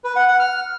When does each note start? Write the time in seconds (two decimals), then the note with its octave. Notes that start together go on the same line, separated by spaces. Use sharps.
0.04 B4
0.16 F#5
0.28 F#5
0.40 F6